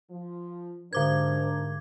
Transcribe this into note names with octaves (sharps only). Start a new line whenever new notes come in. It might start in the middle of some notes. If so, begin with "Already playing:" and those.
F3
G#2 D3 D4 A#4 C5 D6 G#6